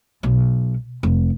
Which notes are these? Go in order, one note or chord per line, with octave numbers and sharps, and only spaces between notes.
B1
F1